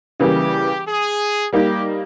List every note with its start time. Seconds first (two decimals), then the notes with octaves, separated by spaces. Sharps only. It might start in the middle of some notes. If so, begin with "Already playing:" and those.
0.20 C#3 E3 G3 A#3 G4
0.86 G#4
1.53 G3 A#3 D#4 G4